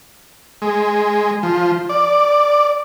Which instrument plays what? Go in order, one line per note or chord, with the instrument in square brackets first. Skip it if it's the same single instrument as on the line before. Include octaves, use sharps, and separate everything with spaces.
[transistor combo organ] G#3
F3
D5